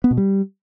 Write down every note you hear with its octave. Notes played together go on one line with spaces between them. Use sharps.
B3
B2
G3